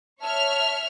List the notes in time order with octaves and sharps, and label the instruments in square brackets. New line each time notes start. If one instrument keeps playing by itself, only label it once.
[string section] C#5 E5 F6 [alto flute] A5